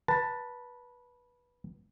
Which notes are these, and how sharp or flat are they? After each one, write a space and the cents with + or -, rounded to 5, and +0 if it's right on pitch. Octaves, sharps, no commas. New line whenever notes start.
B4 -15 A5 +15